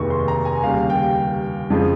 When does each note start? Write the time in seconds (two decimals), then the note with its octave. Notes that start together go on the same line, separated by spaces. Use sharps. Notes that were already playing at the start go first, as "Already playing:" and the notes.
Already playing: F1 D#2 D#3 G#3 C#6
0.10 C6
0.28 A#5
0.45 G#5
0.63 D#2 C#3 G3 F5
0.90 G5
1.70 F2 C#3 F3 G#3